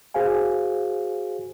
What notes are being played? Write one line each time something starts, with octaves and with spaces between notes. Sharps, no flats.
F#4 G#4 C5 F5 G#5